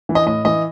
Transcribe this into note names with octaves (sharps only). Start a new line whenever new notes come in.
E3
D#5
A2 D#5
E3 D#5